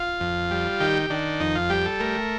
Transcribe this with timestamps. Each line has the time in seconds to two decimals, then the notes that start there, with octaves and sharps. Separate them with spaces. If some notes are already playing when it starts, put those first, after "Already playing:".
Already playing: F4
0.20 F2
0.51 G3
0.80 D#3 G4
1.10 D#3 D4
1.40 F2 D#4
1.56 F4
1.69 G3 G4
1.85 A4
2.00 A3 A#4